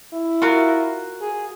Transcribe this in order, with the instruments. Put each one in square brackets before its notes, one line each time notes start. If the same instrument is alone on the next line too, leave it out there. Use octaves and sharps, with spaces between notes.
[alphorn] E4
[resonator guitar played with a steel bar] F4 F#4 A#4
[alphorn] G#4